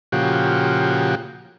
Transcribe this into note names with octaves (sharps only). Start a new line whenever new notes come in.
A#2 C#3 F3 F#4 G4